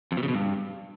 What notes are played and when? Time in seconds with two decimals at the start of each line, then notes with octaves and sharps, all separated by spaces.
0.12 F2
0.17 B2
0.23 C#3
0.28 B2
0.34 G2